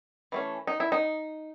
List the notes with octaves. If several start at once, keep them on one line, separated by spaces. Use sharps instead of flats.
E3 A3 C#4
D#4
E4
D#4